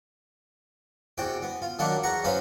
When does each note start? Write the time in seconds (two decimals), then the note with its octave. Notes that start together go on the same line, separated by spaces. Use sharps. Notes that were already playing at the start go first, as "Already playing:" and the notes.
1.18 E2 C3 F#4 G5
1.42 B3
1.62 F4
1.79 D#3 F#3 A#3 D4 F#5
2.03 E2 F#5 A#5 C#6
2.24 F#2 C#4 B4 C5 F5